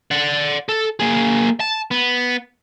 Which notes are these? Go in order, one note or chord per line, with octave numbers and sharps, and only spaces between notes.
D5 F#5
A4
A#3 G#4
A5
B3